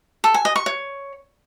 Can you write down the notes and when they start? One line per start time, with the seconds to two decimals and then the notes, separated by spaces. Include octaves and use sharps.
0.24 A4
0.34 G#5
0.45 D#5
0.56 C#6
0.66 C#5